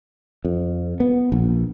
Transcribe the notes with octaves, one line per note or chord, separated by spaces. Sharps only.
F2
B3
A#1